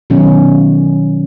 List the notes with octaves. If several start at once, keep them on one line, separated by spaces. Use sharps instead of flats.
B2 D#3 F#3 C#4